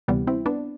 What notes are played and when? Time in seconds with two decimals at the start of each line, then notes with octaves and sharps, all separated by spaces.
0.08 D2 C3 E3 G3 B3
0.27 C4 E4
0.46 B3 D4